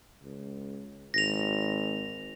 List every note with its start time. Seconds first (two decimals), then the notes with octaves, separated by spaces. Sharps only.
0.23 C#2
1.14 G#1 A#6 F7